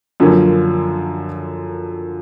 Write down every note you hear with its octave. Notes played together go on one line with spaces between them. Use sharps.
F#2 D3 F3 A#3 C#4